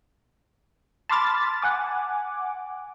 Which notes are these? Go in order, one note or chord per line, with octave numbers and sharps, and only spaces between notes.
A5 B5 C6 D6 F6 A6
F#5 G#5 D6